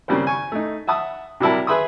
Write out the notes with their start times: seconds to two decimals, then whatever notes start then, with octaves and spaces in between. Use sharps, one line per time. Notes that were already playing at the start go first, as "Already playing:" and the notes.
0.08 C#3 G3 A#3 C4 C5
0.27 G#5 C#6
0.52 A3 D#4
0.87 E5 F#5 A5 D#6
1.40 C3 F#3 G3 E4 A#4 A5
1.67 G#4 B4 E5 B5 C6 D#6